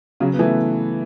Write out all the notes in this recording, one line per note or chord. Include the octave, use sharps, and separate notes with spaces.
C#3 F#3
B3
E3 A3